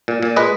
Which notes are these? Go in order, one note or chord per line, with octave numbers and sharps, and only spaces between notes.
A#2
A#2
G#3 B4 D#5